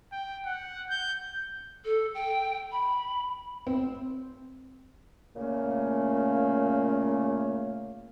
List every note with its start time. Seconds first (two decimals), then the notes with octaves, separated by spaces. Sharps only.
0.12 G5
0.45 F#5
0.90 G6
1.85 A4
2.14 G5
2.72 B5
3.67 C4
5.36 A#2 C#3 A3 A#3 C#4